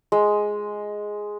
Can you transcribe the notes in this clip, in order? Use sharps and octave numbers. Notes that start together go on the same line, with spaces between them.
G#3